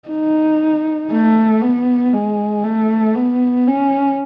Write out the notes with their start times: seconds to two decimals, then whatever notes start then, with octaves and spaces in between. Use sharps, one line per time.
0.08 D#4
1.11 A3
1.62 B3
2.13 G#3
2.64 A3
3.15 B3
3.67 C#4